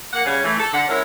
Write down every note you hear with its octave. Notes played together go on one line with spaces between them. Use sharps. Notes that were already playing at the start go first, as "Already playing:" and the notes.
A#3 F#5
C#3 G3 C#4
E3 A3
A4
D3 F#5
G#3 C#4 E4 A#4 E5